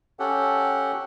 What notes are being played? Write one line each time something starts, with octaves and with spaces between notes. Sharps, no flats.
C#4 G4 A4 F#5